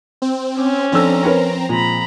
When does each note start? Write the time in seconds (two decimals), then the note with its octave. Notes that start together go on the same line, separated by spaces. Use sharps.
0.22 C4
0.58 C#4 D6
0.92 F3 C4 D4 A4 A#5 E6
1.23 A#4 B4 C#5
1.69 A#2 G#3 C4 A#5 B5